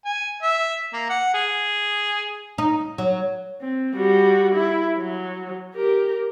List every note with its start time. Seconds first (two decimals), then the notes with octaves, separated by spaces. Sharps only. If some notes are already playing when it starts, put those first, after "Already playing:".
0.05 G#5
0.43 E5
0.93 A#3
1.10 F#5
1.34 G#4
2.58 D#4
2.98 F#3
3.62 C4
3.95 G3 F#4
4.55 E4
4.97 F#3
5.75 G4 A#4